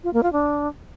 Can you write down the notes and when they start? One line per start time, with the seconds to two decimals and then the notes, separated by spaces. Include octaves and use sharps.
0.04 F4
0.13 A#3
0.23 F4
0.33 D4